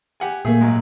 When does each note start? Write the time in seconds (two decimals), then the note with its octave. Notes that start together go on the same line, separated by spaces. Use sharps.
0.20 G4 F#5 G#5
0.45 A#2 A3 A#3 G#4
0.61 G#1 F#3 G#3